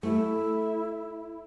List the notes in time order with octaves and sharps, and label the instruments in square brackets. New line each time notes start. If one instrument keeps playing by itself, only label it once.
[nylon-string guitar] A3 [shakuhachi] E4